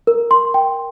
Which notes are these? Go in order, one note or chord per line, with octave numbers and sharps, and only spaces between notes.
A#4
C6
G5